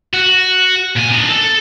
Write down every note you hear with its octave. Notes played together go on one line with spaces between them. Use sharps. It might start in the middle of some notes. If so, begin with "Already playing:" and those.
F#4
A#2 G#5
D4 D#4
A4